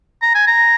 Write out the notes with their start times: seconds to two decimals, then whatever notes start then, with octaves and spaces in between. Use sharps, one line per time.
0.22 A#5
0.35 G#5
0.47 A#5